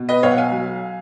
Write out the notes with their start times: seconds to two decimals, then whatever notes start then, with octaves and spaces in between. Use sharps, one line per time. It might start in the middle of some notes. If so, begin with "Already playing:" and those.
Already playing: B2
0.09 B4 D#5
0.23 B1 C#5 F5
0.32 F#5
0.38 F5 G#5
0.51 F#3